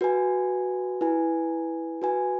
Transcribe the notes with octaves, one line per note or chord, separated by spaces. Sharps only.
F#4 B4 G#5
E4 B4 G#5
F#4 B4 G#5